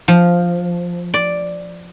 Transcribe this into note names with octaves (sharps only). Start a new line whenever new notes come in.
F3
D5